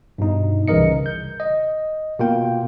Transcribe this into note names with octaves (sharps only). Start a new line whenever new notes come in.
G2 B2 D#4
C2 C#3 E3 A#4 D#5 C#7
G6
D#5
B2 A#3 F4 G5